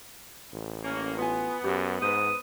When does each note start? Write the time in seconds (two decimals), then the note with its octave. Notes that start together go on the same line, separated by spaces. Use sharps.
0.53 A1
0.83 A#3 C#4
1.18 B3 F4 G#5
1.64 F#2 C#4 G4
2.02 G#2 B4 C5 D#6